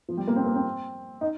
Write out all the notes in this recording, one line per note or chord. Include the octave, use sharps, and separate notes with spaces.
F3
G3
A#3
C4
A#3
C4
D#4